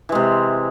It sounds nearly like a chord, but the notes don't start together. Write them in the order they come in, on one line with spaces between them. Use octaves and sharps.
E3 G#3 C3